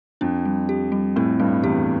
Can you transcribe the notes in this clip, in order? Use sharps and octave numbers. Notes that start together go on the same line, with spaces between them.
F2 D4
G3
G4
G3
A2 C4
G2 G3
E2 G4